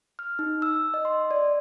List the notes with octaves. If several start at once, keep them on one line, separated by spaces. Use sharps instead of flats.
F6
D#4
E6
D#5
C6
D5